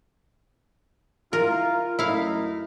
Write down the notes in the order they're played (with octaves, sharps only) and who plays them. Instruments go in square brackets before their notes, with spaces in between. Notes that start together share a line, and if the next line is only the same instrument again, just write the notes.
[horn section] E4 F4 [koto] A#4
[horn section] F#2 A3 D#4 [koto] E4 F5